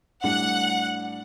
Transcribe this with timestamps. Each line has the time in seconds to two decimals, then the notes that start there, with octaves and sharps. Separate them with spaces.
0.24 A2 G3 D4 F#5